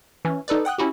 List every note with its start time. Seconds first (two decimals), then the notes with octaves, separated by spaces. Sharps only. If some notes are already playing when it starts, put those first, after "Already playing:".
0.25 E3 C#4
0.48 D#4 A4 B4 D5
0.65 F#5 G5 D#6 F#6
0.78 C#4 E4 F#4 G4